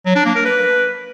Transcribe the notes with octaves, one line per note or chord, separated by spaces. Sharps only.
F#3
D4
A#3
A#4
B4